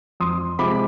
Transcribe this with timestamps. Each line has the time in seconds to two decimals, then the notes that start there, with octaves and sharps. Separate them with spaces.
0.20 F2 C6 D#6
0.59 C3 F3 G#3 B5 D6